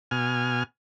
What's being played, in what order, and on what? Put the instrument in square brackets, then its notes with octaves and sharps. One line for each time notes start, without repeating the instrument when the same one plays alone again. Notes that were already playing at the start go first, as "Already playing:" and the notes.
[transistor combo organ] B2 G#5 F6